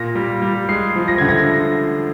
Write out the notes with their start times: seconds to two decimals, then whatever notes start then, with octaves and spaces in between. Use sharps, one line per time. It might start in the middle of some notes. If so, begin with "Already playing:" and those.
Already playing: A#2 A#6
0.15 G3
0.42 G3
0.69 G#3 C7
0.96 F3
1.08 A#6
1.18 D3 G#6
1.29 A#6